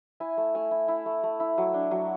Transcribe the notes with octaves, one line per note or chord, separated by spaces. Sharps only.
E4 G#5
A3
A3 G#5
E4
E4
A3
A3
E4
F#3
D4
F#3